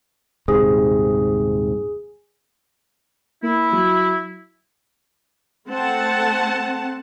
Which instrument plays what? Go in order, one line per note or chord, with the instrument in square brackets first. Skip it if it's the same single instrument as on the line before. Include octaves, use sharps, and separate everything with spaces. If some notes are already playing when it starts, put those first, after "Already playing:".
[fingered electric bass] D#1 G#2 C3 [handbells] G#4
[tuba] A#3 [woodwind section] E4
[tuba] F#3
[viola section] A3 C4 F#5 A5